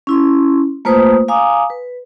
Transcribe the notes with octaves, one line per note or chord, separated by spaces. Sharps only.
C#4 E4 C6
A3 A#3 F4 B4 C5 D#6
F5 G#5 A#5 D6 D#6
B4